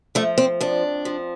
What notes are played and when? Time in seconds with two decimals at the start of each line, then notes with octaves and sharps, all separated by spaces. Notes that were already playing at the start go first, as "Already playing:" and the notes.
0.15 F3 A3
0.38 C4
0.61 F2 D4
1.05 F3